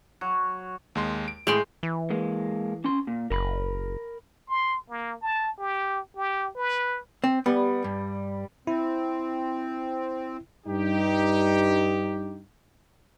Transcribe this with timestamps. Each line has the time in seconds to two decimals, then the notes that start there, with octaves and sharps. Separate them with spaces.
0.21 F#3
0.95 D#2 G#3 C6
1.28 D7
1.47 A2 G#3 G5 C6
1.83 E3
2.11 G#3 A#3
2.84 C#4 C6
3.07 A#2
3.30 F#1 A#4 B5
4.48 C6
4.90 A#3
5.21 A5
5.59 G4
6.16 G4
6.56 B4
7.24 C4
7.46 G3 B3
7.84 G2
8.67 C4 E4
10.66 G2 D#4 G4